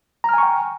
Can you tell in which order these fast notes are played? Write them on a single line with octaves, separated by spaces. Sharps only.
A#5 F6 G#5 C#6 G5